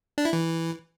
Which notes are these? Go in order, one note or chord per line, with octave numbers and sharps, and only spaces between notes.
D4
E4
E3